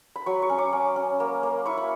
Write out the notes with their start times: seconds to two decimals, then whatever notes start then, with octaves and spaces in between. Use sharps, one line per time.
0.16 B5
0.26 F#3 C#6
0.42 C#6
0.49 C#4
0.58 D6
0.73 C#4
0.96 C#4
1.20 A#3
1.43 A#3
1.66 E4 C#6
1.78 B5